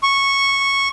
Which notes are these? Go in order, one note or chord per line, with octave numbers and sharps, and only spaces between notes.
C#6